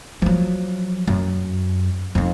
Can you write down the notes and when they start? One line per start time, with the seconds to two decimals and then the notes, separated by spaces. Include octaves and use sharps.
0.22 F3 F#3
1.07 F#2
2.15 F2 D#4